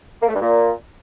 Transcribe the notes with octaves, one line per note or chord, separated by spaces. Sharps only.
A#3
A3
G2
A#2